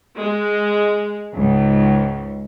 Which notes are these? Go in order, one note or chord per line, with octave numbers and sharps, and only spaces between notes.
G#3
C#2 G#2